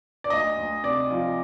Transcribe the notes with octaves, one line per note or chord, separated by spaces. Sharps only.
D5
D2 D#5
D2
C3 D5
F3